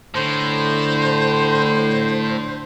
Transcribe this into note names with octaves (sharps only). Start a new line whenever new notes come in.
A2 D3 C5